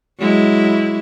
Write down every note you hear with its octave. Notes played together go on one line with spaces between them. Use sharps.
F#3 G#3 E4